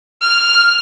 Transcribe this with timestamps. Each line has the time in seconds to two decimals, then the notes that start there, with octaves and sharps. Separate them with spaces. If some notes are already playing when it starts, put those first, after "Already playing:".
0.22 F6